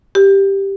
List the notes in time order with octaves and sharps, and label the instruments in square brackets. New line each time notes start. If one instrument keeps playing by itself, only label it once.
[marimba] G4